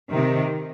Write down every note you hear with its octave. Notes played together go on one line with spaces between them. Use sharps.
C3 D#3